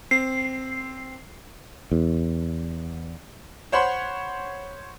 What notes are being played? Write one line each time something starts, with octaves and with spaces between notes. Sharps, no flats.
C4 C7
E2
C5 C#5 F#5 B5 C6